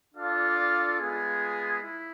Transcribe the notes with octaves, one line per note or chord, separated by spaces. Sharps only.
D4 F4 A4 D5 F5
G#3 B3 F4 G#4
E4